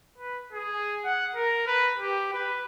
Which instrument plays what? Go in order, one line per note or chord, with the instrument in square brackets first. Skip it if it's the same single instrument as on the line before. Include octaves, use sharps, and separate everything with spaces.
[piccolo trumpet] B4
G#4
F#5
A#4
B4
G4
B4